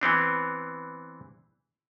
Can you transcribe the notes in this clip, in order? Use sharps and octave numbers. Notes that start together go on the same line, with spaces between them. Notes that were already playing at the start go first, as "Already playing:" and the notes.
E3 B3 C4 D4